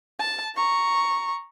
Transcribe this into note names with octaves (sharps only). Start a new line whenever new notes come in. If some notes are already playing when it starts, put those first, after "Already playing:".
A5
A#5 C#6